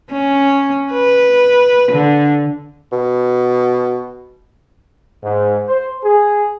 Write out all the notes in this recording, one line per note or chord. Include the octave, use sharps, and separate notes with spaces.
C#4
B4
D3
B2
G#2
C5
G#4